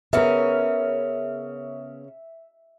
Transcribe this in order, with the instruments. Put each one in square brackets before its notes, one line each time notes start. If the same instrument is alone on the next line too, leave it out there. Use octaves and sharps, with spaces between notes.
[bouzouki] C#3 C#4 [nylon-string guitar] B3 A#4 [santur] E5